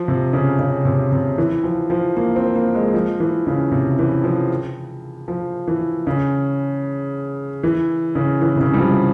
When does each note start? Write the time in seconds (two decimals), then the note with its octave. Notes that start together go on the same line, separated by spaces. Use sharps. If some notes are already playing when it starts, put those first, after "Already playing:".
Already playing: F3
0.08 C3
0.33 C#3
0.59 C#3
0.85 C3
1.12 C3
1.38 E3
1.64 F3
1.90 F3
2.16 A#3
2.36 C4
2.55 A#3
2.75 G#3
2.94 F3
3.20 E3
3.47 C#3
3.72 C3
3.99 E3
4.24 F3
5.28 F3
5.68 E3
6.07 C#3
7.63 E3
8.15 C#3
8.42 E3
8.56 C3
8.61 C#3
8.74 G3
8.79 F3